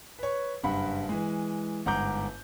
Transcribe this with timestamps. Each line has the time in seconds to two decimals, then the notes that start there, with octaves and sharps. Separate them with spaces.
0.19 B4 C#5
0.63 F#1 G2 F#5 B5
1.09 E3 G#3
1.86 G1 G#2 F#5 A#5 D6 G6